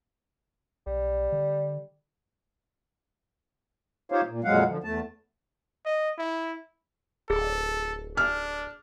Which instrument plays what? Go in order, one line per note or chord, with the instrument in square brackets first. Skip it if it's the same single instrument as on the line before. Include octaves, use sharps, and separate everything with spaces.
[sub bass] B1 [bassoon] G3
[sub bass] D3
[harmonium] D#4 F4 G4 C5 C#5 F5
A#2
F2 A#2 F#3 G#3 F5 F#5
D3 F3
E2 A3 A5
[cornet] D#5
E4
[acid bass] D1 [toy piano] G#4 [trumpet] A4
[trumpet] D4 [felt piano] F6